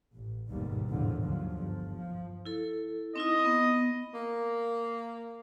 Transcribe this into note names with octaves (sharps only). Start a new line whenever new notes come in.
A1
G1 D#2 G#2 B2 D#3 G3
G#1 E2 A2 D3 F3
D#2 D3 F3 F#3
G1 F3
F3
E4 A4
C4 D#4 E4 D#5
B3
A#3